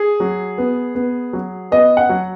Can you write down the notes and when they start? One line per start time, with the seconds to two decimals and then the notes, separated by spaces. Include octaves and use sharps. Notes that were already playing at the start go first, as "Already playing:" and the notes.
Already playing: G#4
0.20 F#3
0.58 B3
0.95 B3
1.33 F#3
1.72 B3 D#5
1.97 F#5
2.09 F#3